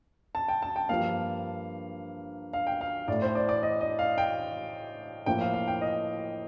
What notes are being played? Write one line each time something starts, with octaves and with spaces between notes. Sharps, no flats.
A5
G5
A5
G5
G2 F3 A#3 F5
F5
G5
F5
A2 A3 D5
C5
D5
D5
D#5
D#5
F5
G5
A2 F3 A#3 G5
F5
F5
G5
D#5